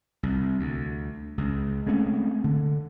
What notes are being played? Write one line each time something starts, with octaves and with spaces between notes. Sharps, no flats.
C2
D2
C#2
G#3 A3 C4 C#4
D3